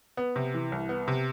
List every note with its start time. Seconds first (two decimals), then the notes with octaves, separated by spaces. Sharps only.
0.17 B3
0.36 C3
0.54 E3
0.72 C2
0.89 B3
1.08 C3